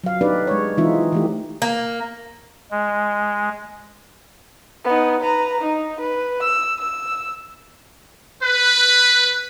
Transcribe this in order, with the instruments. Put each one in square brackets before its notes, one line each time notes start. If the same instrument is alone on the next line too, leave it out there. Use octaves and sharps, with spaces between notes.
[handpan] F#3 F5
D4 D#4 G4 B4 D5
G#3 C#5
E3 G#3 C4 D#4 F4 E5
E3 A3 G4
[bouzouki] A#3
[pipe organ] G#3
[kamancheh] B3 D#4
B4 A#5
D#4
B4
E6
E6
[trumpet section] B4